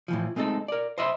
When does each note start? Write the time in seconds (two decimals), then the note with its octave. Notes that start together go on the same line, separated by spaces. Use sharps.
0.08 A2 E3 F3
0.36 G#3 A3 C4 D#4 A4
0.68 A#4 D5
0.98 C5 D#5 E5 B5 C6